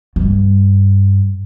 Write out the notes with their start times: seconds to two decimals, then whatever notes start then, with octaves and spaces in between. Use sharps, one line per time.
0.16 G2